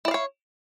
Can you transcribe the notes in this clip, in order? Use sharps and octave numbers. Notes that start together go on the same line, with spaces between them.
E4 C#5 D5 F5